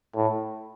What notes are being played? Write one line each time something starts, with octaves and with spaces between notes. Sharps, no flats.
A2